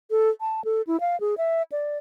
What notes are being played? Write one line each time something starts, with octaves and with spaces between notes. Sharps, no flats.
A4
A5
A4
E4
F5
G#4
E5
D5